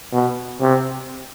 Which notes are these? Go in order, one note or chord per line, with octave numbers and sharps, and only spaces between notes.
B2
C3